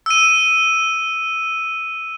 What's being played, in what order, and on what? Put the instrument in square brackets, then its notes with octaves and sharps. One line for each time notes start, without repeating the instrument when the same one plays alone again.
[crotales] E6 D#7